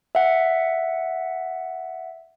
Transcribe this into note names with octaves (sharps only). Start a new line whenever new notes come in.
E5 F#5